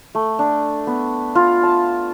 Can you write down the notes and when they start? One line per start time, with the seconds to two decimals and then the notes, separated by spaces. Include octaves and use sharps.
0.15 A3
0.39 D4
0.87 B3
1.35 F4
1.63 A5